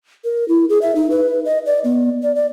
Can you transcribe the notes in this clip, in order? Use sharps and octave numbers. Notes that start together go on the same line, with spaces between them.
A#4
E4
G#4
E5
D#4
B4
D#5
D5
B3
D5
D5